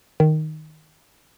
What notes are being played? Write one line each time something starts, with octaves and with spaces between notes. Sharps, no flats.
D#3